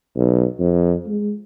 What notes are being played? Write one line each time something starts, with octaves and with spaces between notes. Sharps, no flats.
B1
F2
G#3